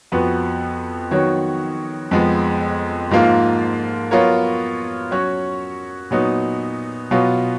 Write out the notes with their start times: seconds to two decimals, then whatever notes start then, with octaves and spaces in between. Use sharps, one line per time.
0.12 F2 F3 B3 F#4 B4
1.11 D#3 F#3 B3 F#4 C#5
2.11 F2 F3 G#3 B3
3.11 G#2 F3 A#3 F4
4.11 F#3 B3 F4 A#4 C#5
5.11 F#3 C#4 F#4 C#5
6.11 A#2 F#3 B3 D#4 F#4
7.11 B2 F#3 B3 F4